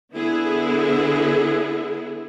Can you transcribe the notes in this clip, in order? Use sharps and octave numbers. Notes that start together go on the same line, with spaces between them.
D3 B3 E4 G#4